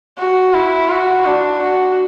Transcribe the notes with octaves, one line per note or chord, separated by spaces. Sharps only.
F#4
E4
F#4
D4
F#4